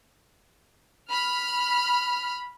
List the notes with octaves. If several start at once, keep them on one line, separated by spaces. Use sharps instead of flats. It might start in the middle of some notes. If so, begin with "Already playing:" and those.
B5 F6